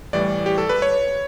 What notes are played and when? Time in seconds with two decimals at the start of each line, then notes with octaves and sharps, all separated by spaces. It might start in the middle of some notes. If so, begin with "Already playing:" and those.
0.13 A2 E3 G3 D5
0.46 G4
0.58 A4
0.69 B4
0.82 C#5